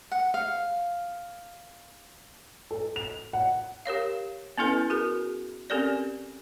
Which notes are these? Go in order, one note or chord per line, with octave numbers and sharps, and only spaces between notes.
F#5
F5
A4
F7
F#5
G4 A#4 C#5 F5
B3 C#4 E4 A4 B4
F#4 G#4 A#4
C4 C#4 G4 A4 A#4 D5